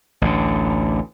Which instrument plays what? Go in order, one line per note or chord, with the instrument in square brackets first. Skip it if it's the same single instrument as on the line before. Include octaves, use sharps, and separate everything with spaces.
[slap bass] A1 D2 D3